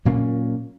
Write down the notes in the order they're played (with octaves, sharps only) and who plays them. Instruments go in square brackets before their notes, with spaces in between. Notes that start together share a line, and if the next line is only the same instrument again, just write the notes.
[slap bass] A#2 F#3 A#3 C#4